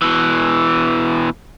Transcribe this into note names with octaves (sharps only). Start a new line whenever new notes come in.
B2 E3